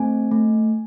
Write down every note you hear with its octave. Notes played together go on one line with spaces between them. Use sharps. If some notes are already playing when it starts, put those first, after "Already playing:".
Already playing: A3 C4 G#5
A3